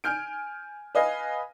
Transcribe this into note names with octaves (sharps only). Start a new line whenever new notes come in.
G#5 F6 G6 D7
B4 D#5 F5 G#5